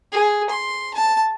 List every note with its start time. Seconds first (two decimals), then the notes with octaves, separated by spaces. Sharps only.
0.12 G#4
0.49 C6
0.94 A5